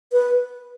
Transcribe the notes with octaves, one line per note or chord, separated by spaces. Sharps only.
B4